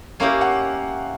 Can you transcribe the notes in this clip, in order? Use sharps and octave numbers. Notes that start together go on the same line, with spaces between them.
A#3 C#4 E4 G4 A#4 F5
F#5